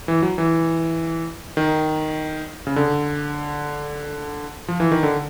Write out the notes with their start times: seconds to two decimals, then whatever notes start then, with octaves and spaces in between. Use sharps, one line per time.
0.08 E3
0.22 F#3
0.38 E3
1.57 D#3
2.67 C#3
2.76 D3
4.68 F3
4.80 E3
4.91 D#3
5.03 D3